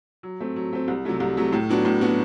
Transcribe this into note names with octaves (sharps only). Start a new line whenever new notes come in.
F#3
A3 C4
F#3
A3 C4
C2
C3 F#3 A3
C2
C3 F#3 A3
A2
F#3 B3 D4 F#4
A2
F#3 B3 D4 F#4